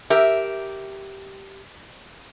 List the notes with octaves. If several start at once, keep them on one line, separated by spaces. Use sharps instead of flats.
G4 A#4 E5